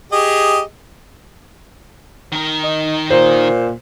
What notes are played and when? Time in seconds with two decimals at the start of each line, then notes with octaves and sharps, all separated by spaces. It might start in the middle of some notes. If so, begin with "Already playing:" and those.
0.12 G4 G#4 D#5
2.32 D#3 A#4
2.63 D#4
3.10 A#2 C5